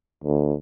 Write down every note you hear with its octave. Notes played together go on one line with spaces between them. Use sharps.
D2